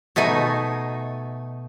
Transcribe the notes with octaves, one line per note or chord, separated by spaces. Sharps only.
B2 A3 D#4 G#5